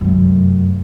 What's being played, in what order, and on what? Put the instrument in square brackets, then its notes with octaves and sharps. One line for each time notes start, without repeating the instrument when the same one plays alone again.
[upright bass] F1 F#2